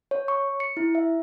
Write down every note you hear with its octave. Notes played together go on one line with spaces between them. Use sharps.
C#5
C#6
C#7
E4
E5